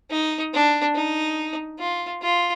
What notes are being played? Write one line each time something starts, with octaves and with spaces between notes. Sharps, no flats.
D#4
D4
D#4
F4
F4